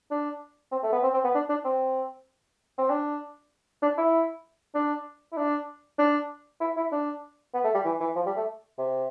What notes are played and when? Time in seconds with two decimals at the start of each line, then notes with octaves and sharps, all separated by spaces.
0.11 D4
0.72 C4
0.83 A3
0.92 B3
1.03 C4
1.13 C4
1.24 B3
1.34 D4
1.49 D4
1.65 C4
2.78 C4
2.90 D4
3.82 D4
3.98 E4
4.75 D4
5.32 E4
5.37 D4
5.99 D4
6.61 E4
6.76 E4
6.92 D4
7.54 B3
7.64 A3
7.74 G3
7.84 E3
8.00 E3
8.16 F3
8.26 G3
8.36 A3
8.78 C3